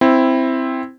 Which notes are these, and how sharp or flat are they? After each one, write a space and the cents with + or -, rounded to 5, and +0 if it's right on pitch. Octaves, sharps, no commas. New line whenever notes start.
C4 +0 E4 +0